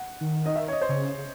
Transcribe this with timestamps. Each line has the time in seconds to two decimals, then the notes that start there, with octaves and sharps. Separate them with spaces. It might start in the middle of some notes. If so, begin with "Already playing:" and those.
Already playing: F#5
0.21 D#3
0.46 D#5
0.56 E5
0.68 C#5
0.72 D#5
0.81 C5
0.89 C#3 C#5
1.18 C#3